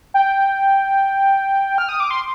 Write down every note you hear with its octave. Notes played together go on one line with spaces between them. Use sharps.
G5
F6
D#6
D6
C6